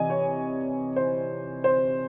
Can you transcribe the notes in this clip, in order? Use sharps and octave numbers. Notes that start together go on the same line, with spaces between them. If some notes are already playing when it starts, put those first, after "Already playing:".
Already playing: C3 E3 D#5 G#5
C#5
C5
C5